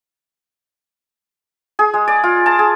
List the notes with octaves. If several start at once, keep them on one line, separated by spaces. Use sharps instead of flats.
G#4
G#3
D5
F4
A5
G#4